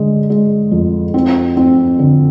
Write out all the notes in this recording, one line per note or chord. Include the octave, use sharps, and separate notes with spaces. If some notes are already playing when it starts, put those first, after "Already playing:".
Already playing: D3 G#3
G#3
F2
C4
C4
D3